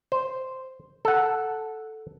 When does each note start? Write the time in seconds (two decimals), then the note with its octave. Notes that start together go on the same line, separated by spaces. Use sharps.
0.12 C5
1.05 A4 F#5